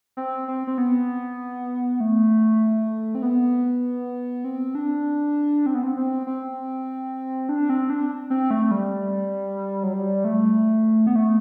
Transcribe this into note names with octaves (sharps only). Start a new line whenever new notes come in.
C4
C4
C4
B3
A3
C4
B3
C4
D4
C4
B3
C4
C4
C4
D4
C4
D4
C4
A3
G3
F#3
G3
A3
B3
A3